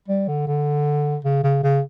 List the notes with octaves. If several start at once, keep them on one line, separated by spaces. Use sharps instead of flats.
G3
D3
D3
C#3
C#3
C#3